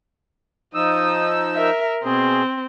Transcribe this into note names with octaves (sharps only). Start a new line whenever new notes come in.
F3 D#4 D#6 E6
A#4 E5
B2 C4 G#4